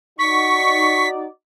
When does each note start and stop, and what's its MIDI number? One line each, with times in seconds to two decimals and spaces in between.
0.19 1.25 63
0.19 1.25 66
0.19 1.25 74
0.19 1.07 85
0.19 1.09 95